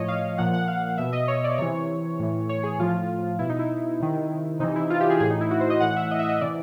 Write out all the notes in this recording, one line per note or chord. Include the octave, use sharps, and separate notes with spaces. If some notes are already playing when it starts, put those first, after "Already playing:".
Already playing: A2 F3 C#5 D#5
F5
A#2 F3 F#5
F#5
F5
B2 E5
D#5
C#5
D5
C3 E3 C#5
A2 E3
C#5
G#4
A2 F3 F4
B2 E4
D#4
E4
C3 D#3
C3 E3 D#4
E4
F4
G4
G#4
A2 E3 G#4
D#4
E4
F#4
C5
D#5
A2 E3 F#5
E5
D#5
E5
D#5
C3 E3 D5